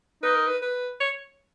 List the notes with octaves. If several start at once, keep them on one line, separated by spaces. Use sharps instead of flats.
D#4 B4
A#4
B4
B4
C#5